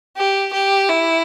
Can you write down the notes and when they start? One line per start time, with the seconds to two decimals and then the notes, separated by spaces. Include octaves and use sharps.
0.17 G4
0.53 G4
0.89 E4